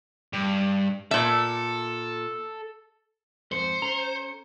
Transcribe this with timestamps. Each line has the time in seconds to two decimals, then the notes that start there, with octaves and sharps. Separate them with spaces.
0.33 G2
1.11 A#2 A4 E5
3.52 F2 G#2 C5 C#7
3.82 C#4 A4 A#5